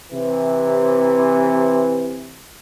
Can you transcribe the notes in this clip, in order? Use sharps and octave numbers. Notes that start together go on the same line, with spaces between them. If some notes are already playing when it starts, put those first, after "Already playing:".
C3 E3